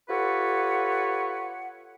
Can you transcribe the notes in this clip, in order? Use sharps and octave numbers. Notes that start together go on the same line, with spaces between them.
F4 G4 A4 B4 C#5 F#5